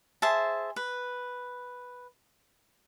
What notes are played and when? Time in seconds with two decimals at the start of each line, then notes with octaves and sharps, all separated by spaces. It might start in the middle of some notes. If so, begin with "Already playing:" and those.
0.22 G#4 C5 E5 A5
0.76 B4